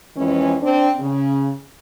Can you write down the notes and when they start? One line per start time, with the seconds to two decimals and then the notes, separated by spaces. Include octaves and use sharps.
0.16 F2 E3 G#3 C#4
0.61 C4 D4
1.00 C#3